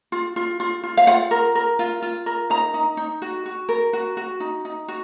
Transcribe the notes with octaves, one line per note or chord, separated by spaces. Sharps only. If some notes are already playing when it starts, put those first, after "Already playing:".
F4
F4
F4
F4
F5
F4 F#5
A#4
A#4
F4
F4
A#4
D#4 A#5
D#4
D#4
F#4
F#4
A#4
F#4
F#4
D#4
D#4
F#4